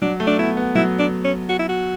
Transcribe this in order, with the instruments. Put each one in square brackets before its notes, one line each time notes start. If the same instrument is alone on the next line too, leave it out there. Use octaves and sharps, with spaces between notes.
[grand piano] F#3 [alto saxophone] D4
[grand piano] A3
[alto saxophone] D4
[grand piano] B3 [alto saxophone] E4
[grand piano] B3
[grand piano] F#3 [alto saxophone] E4
[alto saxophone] D4
C#4
F#4
E4
F#4